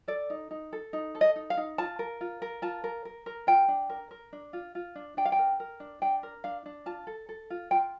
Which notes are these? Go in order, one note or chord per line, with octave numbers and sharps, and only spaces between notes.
A4 D5
D#4
D#4
A4
D#4
A4
D#5
D#4
F5
D#4
F4 A5
A#4
F4
A#4
F4 A5
A#4
A#4
A#4
F4 G5
D4
A#4
A#4
D4
F4
F4
D4
D4 G5
F5
G5
A#4
A#4
D4
D4 G5
A#4
D4 F5
D4
F4 A5
A4
A4
F4
F4 G5